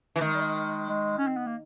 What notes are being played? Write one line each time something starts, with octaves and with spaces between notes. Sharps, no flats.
E3
D#3 A3
G#3
G3
G#3
G#3
C#4
C4
B3
A#3